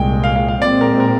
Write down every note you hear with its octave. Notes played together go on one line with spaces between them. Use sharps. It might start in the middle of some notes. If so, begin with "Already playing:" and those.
Already playing: C2 A#2 G#3 G5
F5
F5
F5
A#2 G#3 C4 D5
A#4
A#4